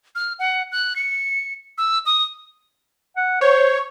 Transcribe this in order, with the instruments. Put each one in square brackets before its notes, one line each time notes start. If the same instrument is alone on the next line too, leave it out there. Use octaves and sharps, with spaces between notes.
[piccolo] F6
F#5
F#6
C#7
E6
D#6
[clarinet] F#5
[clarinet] C5 [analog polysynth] C#5